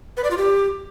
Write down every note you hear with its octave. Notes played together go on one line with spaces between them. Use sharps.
B4
D5
F4
G4